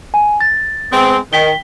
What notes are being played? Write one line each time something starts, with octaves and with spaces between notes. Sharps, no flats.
G#5
A6
G#3 B3 C4
D#3 G5 B6 G7